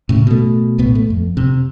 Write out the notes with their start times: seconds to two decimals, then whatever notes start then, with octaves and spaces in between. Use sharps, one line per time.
0.09 A2 C#3
0.27 B2 A3
0.78 B1 A2 B3
0.95 A3
1.10 F2
1.37 C3